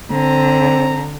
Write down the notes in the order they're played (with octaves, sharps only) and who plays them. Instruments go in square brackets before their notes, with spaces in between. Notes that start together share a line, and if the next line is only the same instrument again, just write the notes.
[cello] D3 [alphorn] C4 [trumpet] A#5